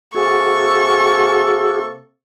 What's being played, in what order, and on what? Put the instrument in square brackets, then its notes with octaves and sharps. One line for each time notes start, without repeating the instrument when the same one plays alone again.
[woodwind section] C3 A#3 A4 [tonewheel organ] F#4 G#4 [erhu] C#6